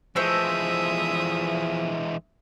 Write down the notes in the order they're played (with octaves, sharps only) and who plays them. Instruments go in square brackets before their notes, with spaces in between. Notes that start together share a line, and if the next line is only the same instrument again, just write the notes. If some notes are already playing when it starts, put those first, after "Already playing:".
[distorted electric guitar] E3 G#3 [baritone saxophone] F3 [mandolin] A3 C5 E6 [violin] E5 D#6